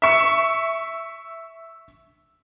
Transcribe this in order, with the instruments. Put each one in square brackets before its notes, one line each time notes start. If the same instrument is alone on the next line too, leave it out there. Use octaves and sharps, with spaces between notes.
[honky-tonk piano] E5 C#6